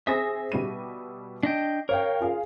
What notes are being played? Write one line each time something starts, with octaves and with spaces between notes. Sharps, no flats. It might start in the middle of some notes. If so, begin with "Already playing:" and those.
C4 G#4 E5 D#6 A#6
B2 G3 D#7
D4 D#5 G5
A#4 C#5 F5 G5
F4 G#4 F5